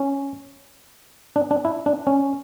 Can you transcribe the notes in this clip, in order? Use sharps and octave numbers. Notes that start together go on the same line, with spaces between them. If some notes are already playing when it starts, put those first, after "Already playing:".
Already playing: C#4
D4
D4
E4
D4
C#4